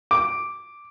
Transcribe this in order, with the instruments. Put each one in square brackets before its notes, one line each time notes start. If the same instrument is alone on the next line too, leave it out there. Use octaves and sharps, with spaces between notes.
[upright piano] D6